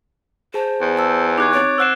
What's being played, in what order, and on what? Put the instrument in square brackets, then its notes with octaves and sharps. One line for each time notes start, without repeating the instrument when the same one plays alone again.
[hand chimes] G#4 A5 [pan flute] C5
[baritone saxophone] E2
[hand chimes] A5 E6
[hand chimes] D#4 G4 C#6 [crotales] D6 F#6 G#6
[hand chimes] C4 A6 D7 [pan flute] C#5
[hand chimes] C5 F#5 C7 [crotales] E6 F#6 E7